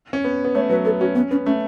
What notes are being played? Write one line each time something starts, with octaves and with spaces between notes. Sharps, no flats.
C#4
B3
B3
A3 C#5
F#3 B4
B3 A4
C#4 F#4
B3 C#4
B3 C#4
A3 C#4